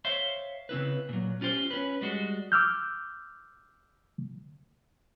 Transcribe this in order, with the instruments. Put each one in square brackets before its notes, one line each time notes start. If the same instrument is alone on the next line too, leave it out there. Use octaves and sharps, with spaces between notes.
[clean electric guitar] C5 C#5 E5 F5 C6
C#3 C4 E4 B4
A#2 F#3
C#4 F4 G4 C5
C#4 B4
G3 G#3 F#4
[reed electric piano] D6 E6 F6 G6